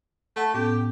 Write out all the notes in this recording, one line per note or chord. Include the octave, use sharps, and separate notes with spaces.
A3 A4 F#5 A5
A2 B3 C#4 G4